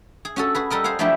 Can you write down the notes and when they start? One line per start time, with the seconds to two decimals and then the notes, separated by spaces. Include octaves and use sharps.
0.25 G#4
0.36 C#4 F#4 A4
0.55 F#4 G#4 B4
0.70 G3 A4 A#4 D#5
0.84 G#4 C5 F5 F#5
0.99 F3 F#3 A3 D4 E4 G4